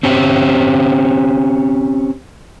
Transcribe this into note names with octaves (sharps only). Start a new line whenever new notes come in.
C4 C#4 G4